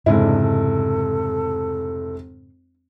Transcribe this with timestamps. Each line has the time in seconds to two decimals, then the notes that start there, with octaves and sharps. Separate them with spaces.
0.06 F1 G#2 C#3 G#3 D4 E4
0.40 A4